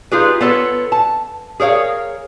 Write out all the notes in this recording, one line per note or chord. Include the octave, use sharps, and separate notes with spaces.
D#4 F4 G4 G#4 B4
B3 F4 A4 C#5
A5
G#4 A#4 C#5 F5